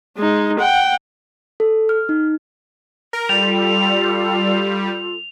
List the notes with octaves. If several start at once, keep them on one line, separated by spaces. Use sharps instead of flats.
G#3 D#4
F#5 G5
A4
F6
D#4
A#4
G3 F4 A4 F7